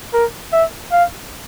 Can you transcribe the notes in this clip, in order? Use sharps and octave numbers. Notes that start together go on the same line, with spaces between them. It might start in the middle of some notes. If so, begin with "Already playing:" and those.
A#4
E5
F5